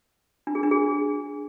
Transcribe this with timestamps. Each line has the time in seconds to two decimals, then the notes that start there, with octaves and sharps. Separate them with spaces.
0.47 D4
0.55 G#4
0.63 D4
0.71 G#4